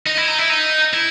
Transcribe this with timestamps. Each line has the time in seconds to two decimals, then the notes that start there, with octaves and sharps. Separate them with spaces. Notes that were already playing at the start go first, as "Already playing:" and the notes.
0.06 D#4
0.17 E4
0.28 D#4
0.39 E4
0.50 D#4
0.94 E4